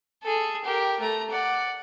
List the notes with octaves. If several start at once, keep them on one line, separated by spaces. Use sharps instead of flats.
G#4 A4
G4 A#4
A3 A#5
D5 F#5